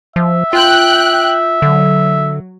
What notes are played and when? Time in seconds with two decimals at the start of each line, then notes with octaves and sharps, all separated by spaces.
0.16 F3 E5
0.53 F4 G5 F#6
1.62 D3 F#3